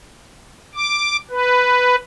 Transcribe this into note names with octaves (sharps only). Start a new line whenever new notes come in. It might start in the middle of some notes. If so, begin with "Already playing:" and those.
D6
B4